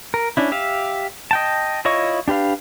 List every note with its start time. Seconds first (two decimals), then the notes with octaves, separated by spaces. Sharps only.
0.14 A#4
0.37 C#4 D4 E4
0.51 G4 E5 F5
1.31 D#5 G5 A5
1.85 E4 F4 C#5 D#5 C#6
2.28 D4 G4 B4 F5